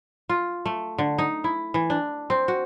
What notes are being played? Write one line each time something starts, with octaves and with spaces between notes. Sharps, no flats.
F4
A3
D3
D#4
E4
E3
D4
C4
F#4